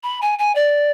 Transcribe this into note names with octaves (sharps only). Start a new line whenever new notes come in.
B5
G#5
G#5
D5